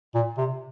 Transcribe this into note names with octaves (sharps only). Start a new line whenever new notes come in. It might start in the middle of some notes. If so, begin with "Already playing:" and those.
A#2
C3